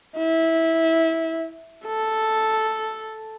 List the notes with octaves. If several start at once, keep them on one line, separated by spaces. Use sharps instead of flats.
E4
A4